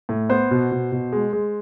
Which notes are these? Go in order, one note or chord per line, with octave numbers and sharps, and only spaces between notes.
A2
B3 C5
B2
B2
B2
G#3
G#3